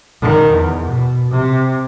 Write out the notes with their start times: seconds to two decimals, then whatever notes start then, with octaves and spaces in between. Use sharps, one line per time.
0.22 D#3
0.53 E2
0.87 B2
1.31 C3